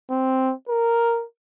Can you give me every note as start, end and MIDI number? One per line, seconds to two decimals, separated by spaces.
0.11 0.53 60
0.69 1.24 70